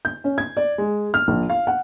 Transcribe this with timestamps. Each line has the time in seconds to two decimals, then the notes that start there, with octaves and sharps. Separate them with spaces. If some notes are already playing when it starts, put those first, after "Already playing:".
0.05 G6
0.24 C#4
0.38 G#6
0.57 D5
0.78 G#3
1.14 F6
1.28 A#1
1.50 F5
1.67 F#5